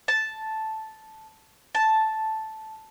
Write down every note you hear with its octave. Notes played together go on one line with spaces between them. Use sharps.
A5
A5